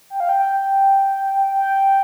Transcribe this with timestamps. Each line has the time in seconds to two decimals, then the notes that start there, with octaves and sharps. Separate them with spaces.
0.10 G5
0.20 F5
0.29 G5
1.54 G5